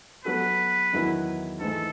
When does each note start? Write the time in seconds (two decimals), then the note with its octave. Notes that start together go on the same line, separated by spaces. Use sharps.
0.25 F#3 B3 F#4 A4 B4
0.93 E2 D#3 F#3 B3 E4
1.60 G#2 E3 A3 A4